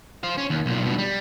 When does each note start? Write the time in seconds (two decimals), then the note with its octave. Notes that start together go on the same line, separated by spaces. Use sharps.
0.23 C5 F5
0.38 C#4
0.50 D#2
0.66 B1 A#2
0.85 G2 B2
0.98 G3